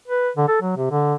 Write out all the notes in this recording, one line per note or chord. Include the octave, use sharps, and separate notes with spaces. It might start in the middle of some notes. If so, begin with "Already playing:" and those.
B4
D3
A4
F#3
C3
D3